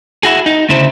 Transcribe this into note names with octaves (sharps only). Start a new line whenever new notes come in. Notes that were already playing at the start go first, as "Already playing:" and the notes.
E4 F#4 G#4
D#4
D2 C#3 E4 C5